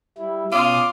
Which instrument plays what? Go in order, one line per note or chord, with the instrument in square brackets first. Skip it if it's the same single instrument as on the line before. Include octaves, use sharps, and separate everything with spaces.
[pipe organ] G3 E4
[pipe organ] B2 C#4 D#6 [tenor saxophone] F4 [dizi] D6